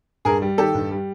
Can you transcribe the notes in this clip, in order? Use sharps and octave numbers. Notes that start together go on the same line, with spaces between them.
G2 G#4 A#4
G3
D#3 G4 A4
G2
G3